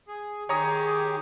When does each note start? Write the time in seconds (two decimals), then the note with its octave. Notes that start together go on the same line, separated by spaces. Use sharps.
0.08 G#4
0.49 D#3 G4 G#4 C#5 A#5 D#6